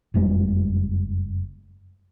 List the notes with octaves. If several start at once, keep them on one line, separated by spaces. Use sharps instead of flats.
F#1 F2 G3 G#3